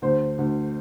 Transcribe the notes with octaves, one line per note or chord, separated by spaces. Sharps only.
D2 C5
D2